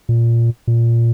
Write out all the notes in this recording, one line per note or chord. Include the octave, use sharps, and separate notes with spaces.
A#2
A#2